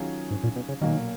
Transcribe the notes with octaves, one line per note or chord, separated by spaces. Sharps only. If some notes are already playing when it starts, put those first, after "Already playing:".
Already playing: D#3 F#3 C#4 F4 G#4
G#2
A#2
B2
C#3
B1 A#2 D#3 F#3 A#3